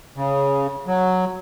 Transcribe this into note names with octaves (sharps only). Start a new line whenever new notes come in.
C#3
F#3